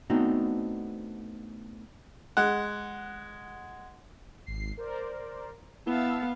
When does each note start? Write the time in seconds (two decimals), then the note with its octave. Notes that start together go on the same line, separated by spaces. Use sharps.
0.10 A3 B3 C4 D4 D#4 F#4
2.37 G#3 F#5
4.46 G#1 C7
4.77 A#4 C5 D5
5.86 B3 E4 F5 A5 E6